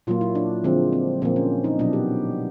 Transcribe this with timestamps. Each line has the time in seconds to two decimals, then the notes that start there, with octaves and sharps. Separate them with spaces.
0.07 A#2 F#3 A#3 F4
0.21 E4
0.35 D4
0.64 D3 F3 G#3 C4
0.93 C4
1.22 A#2 F3 A#3 C4
1.36 C#4
1.64 D#4
1.79 B2 F#3 B3 D4
1.93 G4